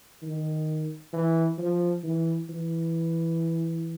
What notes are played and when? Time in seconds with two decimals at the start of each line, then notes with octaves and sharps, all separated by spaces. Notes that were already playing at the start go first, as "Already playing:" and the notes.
0.23 D#3
1.13 E3
1.58 F3
2.04 E3
2.49 E3